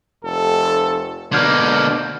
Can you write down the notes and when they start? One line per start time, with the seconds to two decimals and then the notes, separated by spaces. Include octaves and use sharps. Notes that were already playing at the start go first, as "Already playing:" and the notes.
0.24 F1 A4
1.33 B2 D3 A#3 D5 F6 G6 G#6